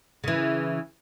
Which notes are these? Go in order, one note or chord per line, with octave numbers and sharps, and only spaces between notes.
C#3 E3